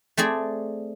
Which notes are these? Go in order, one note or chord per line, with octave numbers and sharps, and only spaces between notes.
A3 C4 G#4 D5